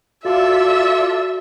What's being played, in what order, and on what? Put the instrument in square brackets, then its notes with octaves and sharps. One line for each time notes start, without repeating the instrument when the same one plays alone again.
[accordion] F4 A4 D5 [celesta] F#4 F5 [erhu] E5